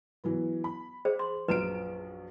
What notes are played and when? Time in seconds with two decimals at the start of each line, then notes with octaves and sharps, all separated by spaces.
0.24 E3 F#3 B3
0.64 B5
1.05 G#4 C5
1.19 C6
1.48 A#1 F#2 B4 A#5 D7